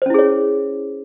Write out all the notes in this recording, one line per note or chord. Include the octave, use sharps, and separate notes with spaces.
C#4 E4 G#4 C5 C#5